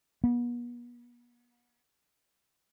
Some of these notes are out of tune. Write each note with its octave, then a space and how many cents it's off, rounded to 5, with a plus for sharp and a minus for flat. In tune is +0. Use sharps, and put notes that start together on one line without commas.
B3 -40